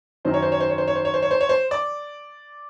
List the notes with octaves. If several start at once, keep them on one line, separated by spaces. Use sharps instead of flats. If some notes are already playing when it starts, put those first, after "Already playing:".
F#2 D#3 C5
C#5
C5
C#5
C5
C#5
C5
C#5
C5
C#5
C5
C#5
C5
C#5
C5
D5